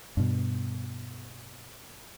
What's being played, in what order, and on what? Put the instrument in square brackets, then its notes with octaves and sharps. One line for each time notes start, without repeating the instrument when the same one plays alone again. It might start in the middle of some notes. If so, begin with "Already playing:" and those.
[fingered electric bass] G2 B2